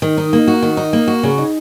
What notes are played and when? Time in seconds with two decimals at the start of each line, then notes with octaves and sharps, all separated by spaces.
0.02 D#3
0.18 D#4
0.33 A#3
0.48 F#4
0.62 D#3
0.77 D#4
0.93 A#3
1.08 F#4
1.23 C#3
1.38 D#4